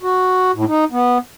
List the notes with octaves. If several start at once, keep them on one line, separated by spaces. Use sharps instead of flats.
F#4
A2
D#4
B3